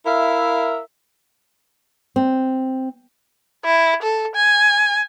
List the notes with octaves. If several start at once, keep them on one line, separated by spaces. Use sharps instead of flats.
E4 A#4 E5 F5
C4
E4
A4
G#5